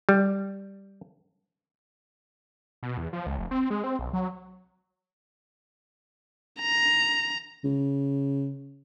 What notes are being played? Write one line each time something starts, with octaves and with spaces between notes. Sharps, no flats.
G3
B2
E2
F3
C#2
F1
C4
G#3
C4
B1
F#3
A#5
C#3